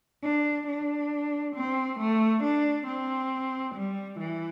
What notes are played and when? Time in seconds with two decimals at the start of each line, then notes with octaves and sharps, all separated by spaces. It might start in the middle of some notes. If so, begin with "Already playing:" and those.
0.23 D4
0.68 D4
1.56 C4
1.99 A3
2.43 D4
2.87 C4
3.75 G3
4.19 E3